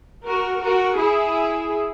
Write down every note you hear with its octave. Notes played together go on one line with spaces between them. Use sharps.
F#4 A#4
F#4 A#4
E4 G#4